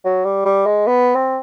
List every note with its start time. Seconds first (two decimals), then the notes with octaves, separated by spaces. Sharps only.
0.05 F#3
0.25 G3
0.45 G3
0.66 G#3
0.87 B3
1.15 C4